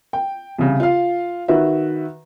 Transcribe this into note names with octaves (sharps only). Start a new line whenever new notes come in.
G5
C2 C#3
F4 F5
D#3 F#4 B4 E5